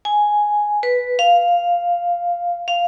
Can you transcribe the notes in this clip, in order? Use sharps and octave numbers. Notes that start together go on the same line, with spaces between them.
G#5
B4
F5
F5